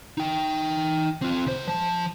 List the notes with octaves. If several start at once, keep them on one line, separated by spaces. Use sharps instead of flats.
D#4 G5
C4 F4
C#3 C5
F3 A5